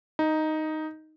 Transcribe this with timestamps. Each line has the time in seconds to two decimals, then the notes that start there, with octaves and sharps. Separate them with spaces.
0.19 D#4